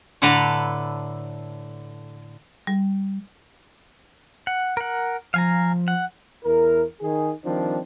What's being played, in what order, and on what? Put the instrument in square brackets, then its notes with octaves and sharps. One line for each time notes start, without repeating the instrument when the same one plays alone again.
[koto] A2 D3 A4 B4 D5 A#5
[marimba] G3
[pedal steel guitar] F#5
A#4 F#5
[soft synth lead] F3 [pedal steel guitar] F5 G#5 A#5
[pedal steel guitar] F#5
[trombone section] E2 E4 A#4
D#3 G#4
D#3 F3 G3 C4 D4